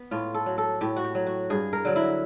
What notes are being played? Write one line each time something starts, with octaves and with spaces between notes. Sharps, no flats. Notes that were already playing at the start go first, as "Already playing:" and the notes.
Already playing: B3
A2 F4
A4
F#3
A4
A2 G4
F#4
G4
F#3
F#4
G2 G#4
A#4
D3 F#3
E4